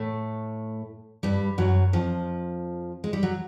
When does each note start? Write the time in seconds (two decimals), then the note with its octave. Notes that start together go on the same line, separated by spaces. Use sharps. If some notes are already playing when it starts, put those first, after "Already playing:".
Already playing: A2 A3
1.23 G2 G3
1.58 F#2 F#3
1.93 F2 F3
3.04 G#3
3.13 G3
3.23 F#3